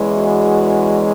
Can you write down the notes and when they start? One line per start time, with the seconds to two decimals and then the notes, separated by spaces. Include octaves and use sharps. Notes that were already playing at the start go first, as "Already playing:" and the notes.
Already playing: E2 E3 G#3 C#4
0.16 F#4